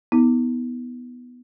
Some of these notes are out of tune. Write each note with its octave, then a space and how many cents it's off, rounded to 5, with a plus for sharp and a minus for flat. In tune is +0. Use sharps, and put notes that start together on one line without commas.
B3 +0 D#4 +45